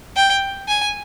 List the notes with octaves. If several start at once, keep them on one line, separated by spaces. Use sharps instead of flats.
G5
G#5